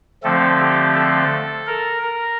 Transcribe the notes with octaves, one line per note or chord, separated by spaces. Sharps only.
D3 F3 A3 C4 A4
G4
A4
A#4
A#4